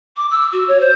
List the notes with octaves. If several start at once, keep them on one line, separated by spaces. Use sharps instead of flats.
D6
E6
F#4
C#5
C5